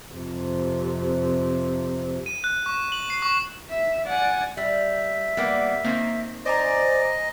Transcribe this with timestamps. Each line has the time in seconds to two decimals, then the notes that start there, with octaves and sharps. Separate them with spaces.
0.11 F2 C3
2.26 D#7
2.44 F#6
2.66 C#6
2.92 F#7
3.10 C7
3.22 C#6
3.70 E5
4.06 D5 F#5 G#5
4.57 G3 E5
5.37 G3 A#3 B3
5.84 D#3 A#3 C4
6.45 C5 D5 D#5 G#5 A#5